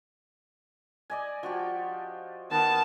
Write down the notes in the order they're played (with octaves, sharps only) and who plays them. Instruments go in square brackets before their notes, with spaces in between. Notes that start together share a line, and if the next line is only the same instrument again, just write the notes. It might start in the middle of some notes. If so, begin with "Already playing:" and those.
[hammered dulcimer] D5 D#5 G#5
F3 F#4 G4
[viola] D#3 A5 [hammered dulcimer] B3 B4